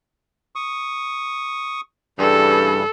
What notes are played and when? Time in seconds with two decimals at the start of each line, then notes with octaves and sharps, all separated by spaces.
0.56 C#6 D#6
2.19 G2 C#3 E3 G3 A4